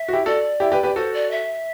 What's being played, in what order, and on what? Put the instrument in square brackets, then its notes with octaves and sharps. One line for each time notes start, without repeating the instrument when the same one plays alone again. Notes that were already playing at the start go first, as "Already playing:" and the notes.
Already playing: [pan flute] E5
[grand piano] F#4
E4 G4
[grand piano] F#4 A4 [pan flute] D5
[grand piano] E4 G4
G4 B4
G4 B4
[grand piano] F#4 A4 [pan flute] C5
[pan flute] D5
E5